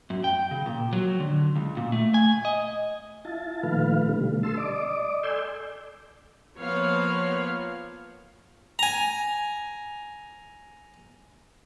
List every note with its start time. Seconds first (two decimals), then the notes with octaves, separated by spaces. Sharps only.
0.10 F#2
0.24 G5
0.51 C#3
0.66 A#2
0.93 F#3
1.20 D3
1.56 C#2
1.77 A#2
1.92 A3
2.14 G#5
2.45 D#5
3.25 E4 F4 A5
3.63 A#2 D#3 F3 A3 B4 F5
4.09 B2 D3 G3 A3
4.43 A5 C6 E6
4.57 D5 D#5 D6
5.23 A4 D5 G#5 C6 E6 G6
6.57 F3 A#3 B3 C#5 F5
8.79 G#5 A#5